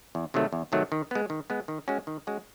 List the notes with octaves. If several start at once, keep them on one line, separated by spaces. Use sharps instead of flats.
E2
C3 D#3 F#3 A3
E2
C3 D#3 F#3 A3
D#3
G#3 B3
D#3
G#3 B3
D#3
G#3 C#4 F#4
D#3
G#3 C#4 F#4